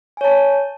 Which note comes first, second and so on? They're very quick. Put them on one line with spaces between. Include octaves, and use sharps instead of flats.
G#5 C#5 A5